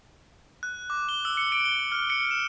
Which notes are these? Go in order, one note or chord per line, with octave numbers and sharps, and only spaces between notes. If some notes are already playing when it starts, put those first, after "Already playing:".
F#6
D6
G7
E6
C#7
D7
G7
F6
C#7
E7